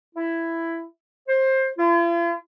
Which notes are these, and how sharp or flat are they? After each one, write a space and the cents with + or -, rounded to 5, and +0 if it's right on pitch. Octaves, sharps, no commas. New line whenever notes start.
E4 +10
C5 +20
F4 -45